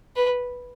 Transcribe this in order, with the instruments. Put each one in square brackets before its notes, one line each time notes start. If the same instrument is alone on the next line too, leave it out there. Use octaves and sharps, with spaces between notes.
[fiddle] B4